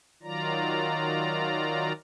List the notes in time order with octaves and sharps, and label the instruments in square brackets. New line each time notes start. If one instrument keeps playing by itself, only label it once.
[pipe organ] D#3 F#3 F4 D5 A#5